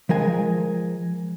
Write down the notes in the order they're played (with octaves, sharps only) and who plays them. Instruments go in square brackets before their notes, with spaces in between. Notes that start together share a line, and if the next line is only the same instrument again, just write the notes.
[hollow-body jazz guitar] F3 G#3 A#4 G#5